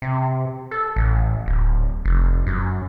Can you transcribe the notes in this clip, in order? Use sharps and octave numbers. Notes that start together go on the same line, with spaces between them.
C3
A4
A1
D1
F1
F#2